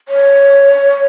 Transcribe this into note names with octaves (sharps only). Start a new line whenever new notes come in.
C#5